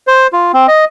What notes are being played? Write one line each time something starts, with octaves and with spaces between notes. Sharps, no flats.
C5
F4
C4
D#5